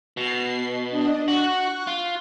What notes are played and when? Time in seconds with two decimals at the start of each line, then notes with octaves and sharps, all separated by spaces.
0.17 B2 C7
0.90 D4 D#5
1.28 F#4 C#6 F#6
1.87 F4